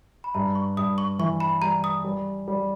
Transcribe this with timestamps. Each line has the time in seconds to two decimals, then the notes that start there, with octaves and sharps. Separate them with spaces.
0.24 B5
0.34 G2 A#5
0.55 C#6
0.77 G2 D#6
0.98 C#6
1.19 E3 C#6
1.40 B5
1.62 G3 A#5
1.84 D#6
2.04 G3
2.48 G3